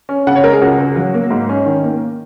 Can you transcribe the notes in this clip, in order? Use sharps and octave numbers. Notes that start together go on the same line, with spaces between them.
C#4
C#3 F#5
C#5
G#3 A#4
G#4
C#2 F#4
C#2
F#3
A#3
G#2
C#4
D#3
A#3